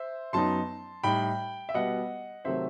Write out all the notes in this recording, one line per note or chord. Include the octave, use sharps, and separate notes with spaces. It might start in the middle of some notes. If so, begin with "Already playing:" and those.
Already playing: C5 E5
F#2 F#3 B3 D#4 A5 C6
A2 G3 D#4 G5 B5
E5
B2 G3 B3 D#5 F#5
C3 D#3 F#3 A3 C5 E5